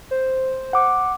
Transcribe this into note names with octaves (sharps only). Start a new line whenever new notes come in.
C5
F#5 D6